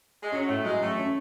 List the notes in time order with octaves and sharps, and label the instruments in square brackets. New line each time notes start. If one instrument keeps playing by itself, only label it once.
[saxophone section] G#3
[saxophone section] F#3 [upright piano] C#4
[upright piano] A2 [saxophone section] A3
[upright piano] F#3 [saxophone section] G#3
[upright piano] A1 [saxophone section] A3
[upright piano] C#4